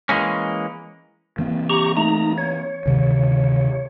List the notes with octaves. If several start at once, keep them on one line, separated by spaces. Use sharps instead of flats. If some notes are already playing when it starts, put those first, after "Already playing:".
E3 G#3 A#3 C#4
E3 A#3 C4
G4 A#5 C#6
A3 D#4 A#5
C#5
D2 C3 D#3